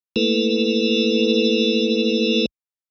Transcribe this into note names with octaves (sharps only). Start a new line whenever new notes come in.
A3 A#3 E4 A4 B4